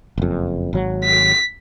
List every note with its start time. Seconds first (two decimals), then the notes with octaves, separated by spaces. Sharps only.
0.18 F#1 F2
0.73 G#1 F#3
1.04 B6